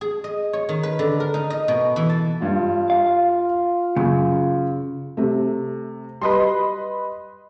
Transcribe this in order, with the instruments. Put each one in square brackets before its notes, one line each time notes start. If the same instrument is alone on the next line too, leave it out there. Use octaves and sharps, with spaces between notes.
[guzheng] G#4
D#5
C#5
D#3
B4
D3
A#4
D#4
D#5
B2
E3
A5
[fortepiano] G2 [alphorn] F4
[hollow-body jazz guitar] F5
[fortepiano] F#2 [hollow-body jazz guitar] C#3
[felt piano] C3 A3
[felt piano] G3 [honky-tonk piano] B4 D#5 C6